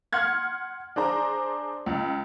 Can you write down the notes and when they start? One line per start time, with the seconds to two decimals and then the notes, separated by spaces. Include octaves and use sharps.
0.13 F#5 C6 F6 G#6
0.96 D4 G#4 C5 A#5
1.86 C#2